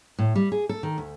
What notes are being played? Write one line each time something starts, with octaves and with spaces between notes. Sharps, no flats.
A2
G3
G#4
A4
D#3
D2